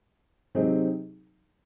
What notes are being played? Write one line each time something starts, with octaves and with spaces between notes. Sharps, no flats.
C3 F#3 C4 D#4 G#4